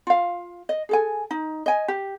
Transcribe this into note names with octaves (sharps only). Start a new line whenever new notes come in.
F4 F5
D#5
G#4 A4 G#5
D#4
D#5 G#5
G4